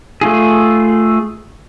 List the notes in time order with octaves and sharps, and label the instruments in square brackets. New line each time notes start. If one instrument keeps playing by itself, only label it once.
[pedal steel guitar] A3 F4 G#4